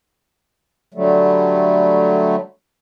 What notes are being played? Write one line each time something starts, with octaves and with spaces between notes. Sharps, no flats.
D3 F#3 G3 A3